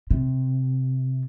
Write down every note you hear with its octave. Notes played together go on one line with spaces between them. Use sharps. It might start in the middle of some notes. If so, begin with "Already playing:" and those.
C3